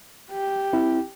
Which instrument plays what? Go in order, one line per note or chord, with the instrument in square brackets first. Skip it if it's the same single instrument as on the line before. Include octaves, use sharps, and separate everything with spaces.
[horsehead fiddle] G4
[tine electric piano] C4 E4